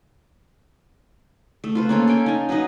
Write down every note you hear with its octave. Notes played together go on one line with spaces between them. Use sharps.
A3
F4 B4 C5
A#3 C#4 A4
A4 F5 G5 G#5
D#4 G#5
F#3 D#4 B4 D#5